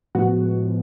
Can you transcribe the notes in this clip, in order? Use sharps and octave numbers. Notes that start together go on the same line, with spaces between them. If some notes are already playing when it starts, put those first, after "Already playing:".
A2 F3 G#3 B3 F#4